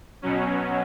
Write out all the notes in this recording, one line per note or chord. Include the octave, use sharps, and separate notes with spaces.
B2 F#3 C#4